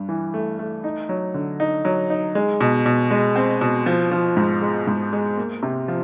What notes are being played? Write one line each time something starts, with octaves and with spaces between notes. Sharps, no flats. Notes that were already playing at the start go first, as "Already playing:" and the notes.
Already playing: G2
E3
A3
A3
D#4
F#3
D3
D#4
F#3
D#4
G#3
B2
B2
G#3
C4
B2
F3
F3
G#2
G#3
G#2
G#3
A#3
C3
F3